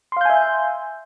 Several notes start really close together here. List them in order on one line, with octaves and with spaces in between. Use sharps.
C6 F5 G6 G#5 E5